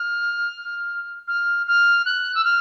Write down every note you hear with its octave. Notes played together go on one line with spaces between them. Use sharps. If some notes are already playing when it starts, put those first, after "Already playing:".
Already playing: F6
F6
F6
F#6
E6
F6